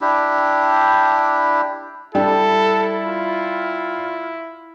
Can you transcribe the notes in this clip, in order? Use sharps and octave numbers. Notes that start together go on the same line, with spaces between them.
D4 E4 G4
G3 D4 E4 A4 G5
F4